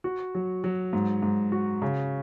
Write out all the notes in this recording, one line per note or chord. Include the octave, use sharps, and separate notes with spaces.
F#4
F#3
F#3
G#2
G#2
F#4
C#3